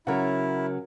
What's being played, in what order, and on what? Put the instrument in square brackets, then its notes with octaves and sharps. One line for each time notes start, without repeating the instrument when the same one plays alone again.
[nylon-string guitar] C#3 F#3 [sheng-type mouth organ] E4 [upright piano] A#4 C#5 F#5